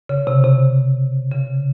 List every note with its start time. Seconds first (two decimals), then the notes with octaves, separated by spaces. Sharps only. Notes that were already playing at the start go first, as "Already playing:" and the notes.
0.09 C#3
0.27 C3
0.44 C3
1.32 C#3